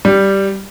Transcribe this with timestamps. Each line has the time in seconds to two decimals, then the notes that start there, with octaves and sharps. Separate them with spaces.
0.05 G3